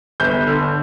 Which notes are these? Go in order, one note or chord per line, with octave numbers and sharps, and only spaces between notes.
G1 G6
D3